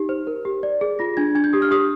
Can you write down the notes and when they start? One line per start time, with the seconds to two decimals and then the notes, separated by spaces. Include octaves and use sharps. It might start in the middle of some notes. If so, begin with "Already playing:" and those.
Already playing: D#4 G4
0.09 C5
0.27 A#4
0.45 G4
0.63 D5
0.81 G#4
0.99 F4 A#6
1.17 D4 G#6
1.35 D4 G#6
1.44 G6
1.53 G4 D#6
1.62 F6
1.71 G4 D#6